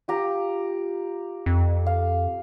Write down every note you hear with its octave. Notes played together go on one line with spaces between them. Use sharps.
F4 G4 A#5
F2
F5